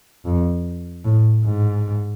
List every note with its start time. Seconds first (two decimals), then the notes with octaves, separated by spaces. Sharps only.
0.25 F2
1.05 A2
1.44 G#2